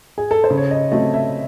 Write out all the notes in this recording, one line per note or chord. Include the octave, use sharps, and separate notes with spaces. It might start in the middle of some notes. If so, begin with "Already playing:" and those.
G#4
A4
C5
C#3
C#5
D#5
F#3 A3 C4 D#5
E5